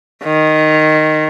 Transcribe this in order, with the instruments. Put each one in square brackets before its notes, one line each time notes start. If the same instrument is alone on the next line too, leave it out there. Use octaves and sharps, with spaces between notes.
[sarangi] D#3